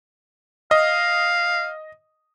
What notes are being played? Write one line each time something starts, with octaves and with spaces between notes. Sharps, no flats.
D#5 F5